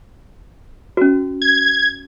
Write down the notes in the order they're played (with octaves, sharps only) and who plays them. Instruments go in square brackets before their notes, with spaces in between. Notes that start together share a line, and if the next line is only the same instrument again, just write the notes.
[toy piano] C#4 F#4
[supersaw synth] G#6